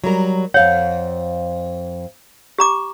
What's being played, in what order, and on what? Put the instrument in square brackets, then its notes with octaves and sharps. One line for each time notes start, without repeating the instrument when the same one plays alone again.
[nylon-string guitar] F#3 G3 A#4
[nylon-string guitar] F2 F5 F#5 [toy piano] C#5
[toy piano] G4 A#5 D6